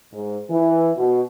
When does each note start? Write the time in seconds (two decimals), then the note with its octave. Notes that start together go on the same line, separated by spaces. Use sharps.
0.13 G#2
0.49 E3
0.96 B2